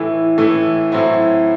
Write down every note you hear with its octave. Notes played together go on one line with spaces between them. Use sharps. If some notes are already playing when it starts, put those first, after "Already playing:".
Already playing: A2 E3 A3 E4
A2 E3 A3 E4
A2 F#3 C4 E4